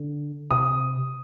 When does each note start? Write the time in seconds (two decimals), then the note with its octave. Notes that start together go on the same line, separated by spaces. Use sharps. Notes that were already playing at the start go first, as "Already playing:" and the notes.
Already playing: D3
0.51 C3 D#6